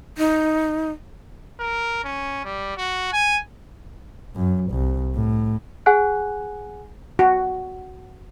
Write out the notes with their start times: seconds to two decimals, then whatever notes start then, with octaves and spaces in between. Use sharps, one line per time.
0.18 D#4
1.60 A#4
2.04 C#4
2.45 G3
2.77 F#4
3.13 G#5
4.36 F#2
4.71 C2
5.14 A2
5.86 G#4 F#5 G#5 F#6
7.19 F#4